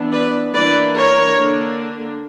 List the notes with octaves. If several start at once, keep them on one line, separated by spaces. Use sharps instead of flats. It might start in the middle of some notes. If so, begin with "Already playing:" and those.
Already playing: E3 B3 D4
B4 D5
E3 A#3 D4 B4 D5
A#4 C#5
D3 A#3 D4